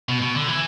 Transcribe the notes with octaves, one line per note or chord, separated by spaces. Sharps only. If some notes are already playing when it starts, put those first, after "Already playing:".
B2
B2
D3
E3